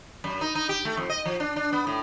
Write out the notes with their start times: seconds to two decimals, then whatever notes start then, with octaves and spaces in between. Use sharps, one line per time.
0.24 F#2
0.41 D#4
0.55 D#4
0.69 G4
0.85 A3
0.97 F2
1.10 D#5
1.25 F3
1.40 D4
1.56 D4
1.72 B3
1.87 A2